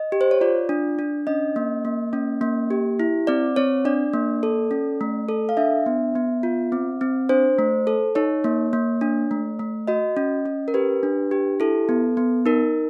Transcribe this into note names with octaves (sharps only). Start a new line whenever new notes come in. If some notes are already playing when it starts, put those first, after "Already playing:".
Already playing: D#5
G4
C5
C#5
F4 D5
D4
D4
C#4 D#5
A#3
A#3
C#4
A#3
G4
E4
C4 D5
C4 C#5
D4 D5
A#3
A4
C#4
A3
A4
F5
D4 E5
B3
B3
F4
C4
C4
D4 C5
A3
A4
D#4 C#5
A#3
A#3
D4
A3
A3
F#4 D#5
C#4
C#4
A#4
G4 B4
D4
G4
E4 A4
B3
B3
D#4 A#4